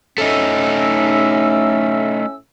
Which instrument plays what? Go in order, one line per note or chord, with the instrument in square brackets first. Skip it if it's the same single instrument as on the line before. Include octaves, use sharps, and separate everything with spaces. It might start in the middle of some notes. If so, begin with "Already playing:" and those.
[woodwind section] A2 C#4 E6 [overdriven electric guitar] A3 D#4